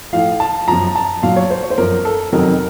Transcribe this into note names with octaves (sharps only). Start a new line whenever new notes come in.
A2 F3 F5
A5
F#2 F3 A#5
A5
A#2 F#3 F5
C#5
C5
C#5
C5
F#2 F3 A#4
A4
F2 C3 D#3 F#3 A#4